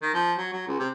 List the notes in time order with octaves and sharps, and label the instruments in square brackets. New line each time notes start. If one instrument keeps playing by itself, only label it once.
[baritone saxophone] D#3
F3
F#3
F#3
C#2
C3